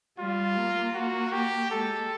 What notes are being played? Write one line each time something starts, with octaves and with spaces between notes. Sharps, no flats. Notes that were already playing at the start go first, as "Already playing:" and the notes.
G3 F4
A#3
F#4
G4
G#3 A4